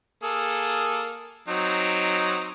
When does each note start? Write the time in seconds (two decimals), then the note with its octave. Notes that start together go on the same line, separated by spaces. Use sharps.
0.23 A#3 G#4 A4
1.48 F#3 C4 D#4